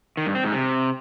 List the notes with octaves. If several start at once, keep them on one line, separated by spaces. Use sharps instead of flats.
D#3
G2
C4
G#2
C3